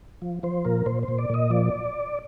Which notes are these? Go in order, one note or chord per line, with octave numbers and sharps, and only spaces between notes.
F3
F3 C5
A#2 A#4
A#2 C5
C5
A#2
D5
A#2 D#5
F3 D5